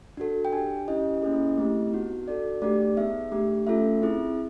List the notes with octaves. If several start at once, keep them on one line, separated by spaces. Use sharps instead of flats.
D4 F#4 A4
G5
D4 G4 G#5
C#4 E4 G4 D#5
A#3 C#4 E4 G#4
A3 C4 E4 G4
B3 D#4 F#4
D4 F#4 A4 D5
A3 D4 G4 D5
B3 D#4 G#4 E5
A3 D4 G4
A3 C#4 F4 A4 E5
C4 E4 G#4